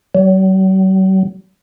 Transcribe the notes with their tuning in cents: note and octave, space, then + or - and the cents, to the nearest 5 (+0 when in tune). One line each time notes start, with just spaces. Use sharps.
F#3 +45